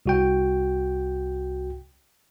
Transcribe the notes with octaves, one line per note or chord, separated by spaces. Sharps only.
C2 F#4 G5